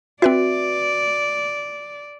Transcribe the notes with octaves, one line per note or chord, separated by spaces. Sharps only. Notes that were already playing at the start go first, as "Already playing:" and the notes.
C4 F#4 B4 D5 E5